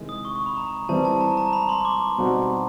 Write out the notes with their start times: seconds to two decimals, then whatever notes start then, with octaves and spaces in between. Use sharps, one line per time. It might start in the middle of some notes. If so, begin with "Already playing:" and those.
Already playing: C3 D#3 G#3 E4
0.09 D#6
0.25 C#6
0.36 C#6
0.46 B5
0.57 A#5
0.89 E3 G3 C4 E4 A5
1.05 A5
1.21 A#5
1.37 A#5
1.53 B5
1.69 C6
1.85 D6
2.18 B2 G3 C4 D#4 F#4